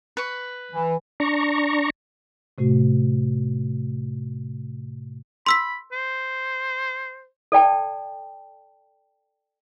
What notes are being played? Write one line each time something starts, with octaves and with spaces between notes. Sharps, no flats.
B4 C#6
E3
D4 A#5 C#6
A2 C3 A3 F#4
B5 C6 E6 B6
C5
A4 D5 G5 A5